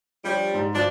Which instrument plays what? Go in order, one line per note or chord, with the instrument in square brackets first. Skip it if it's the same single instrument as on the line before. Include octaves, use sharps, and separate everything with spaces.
[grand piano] F3 D4 C#5 [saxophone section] G3
[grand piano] G#2
[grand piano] G2 F3 F#3 [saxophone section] D4